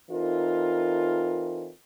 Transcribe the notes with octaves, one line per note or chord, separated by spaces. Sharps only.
E3 C4 D#4 F4 A4 A#4